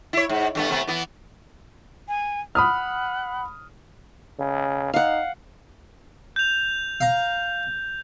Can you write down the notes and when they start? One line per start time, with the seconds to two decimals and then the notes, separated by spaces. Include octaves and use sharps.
0.13 E4 C#5
0.29 G#2
0.55 G2 A3 B3
0.69 C3 A3 B3
0.87 E3 B3
2.08 G#5
2.55 F#5 B5 D#6 F6
4.39 C#3
4.94 D#4 F5 F#5
6.36 G6 F7
7.01 F5 A#5